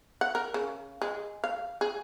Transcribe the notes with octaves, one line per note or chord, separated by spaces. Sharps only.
F#5
A#4
C#3
G#3
F5
G#4